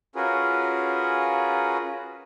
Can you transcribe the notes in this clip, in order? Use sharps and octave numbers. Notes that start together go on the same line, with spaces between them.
C#4 F4 F#4 G#4 A#4 B4